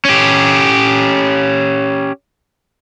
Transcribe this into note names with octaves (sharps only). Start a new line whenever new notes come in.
C#4 G4